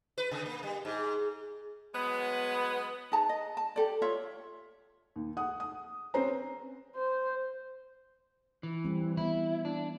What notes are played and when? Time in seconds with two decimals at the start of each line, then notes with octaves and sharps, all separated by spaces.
0.18 B4
0.31 C3
0.46 A#3
0.63 G3
0.85 G#2
1.94 F#3 G#3 B3
3.12 D#4 G#4 A5 A#5
3.29 D#5
3.57 A5
3.76 G4 A4 D5
4.02 F4 C#5 E5
5.16 D#2
5.37 F#5 D#6
5.60 D#6
6.14 C4 C#4 B4 C5 A#5
6.96 C5
8.63 E3
8.85 G3 C4
9.17 E3 B3 E4
9.65 D4